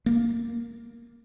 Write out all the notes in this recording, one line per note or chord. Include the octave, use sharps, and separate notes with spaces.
A#3